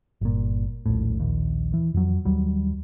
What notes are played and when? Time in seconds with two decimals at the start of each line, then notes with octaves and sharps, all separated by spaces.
0.21 G1 A#2
0.86 D#1 A#1 A2
1.20 A#1 D#2
1.74 E3
1.94 F2 F#3
2.25 D#2 F#3 G3